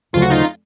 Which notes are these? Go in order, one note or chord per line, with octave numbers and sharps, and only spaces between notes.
D2 C#3 F#3 A3 F4
F#4
D#4 F4